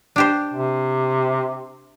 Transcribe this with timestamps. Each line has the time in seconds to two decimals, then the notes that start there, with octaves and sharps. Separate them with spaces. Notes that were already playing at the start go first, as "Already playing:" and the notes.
0.16 D4 G4 C5
0.53 C3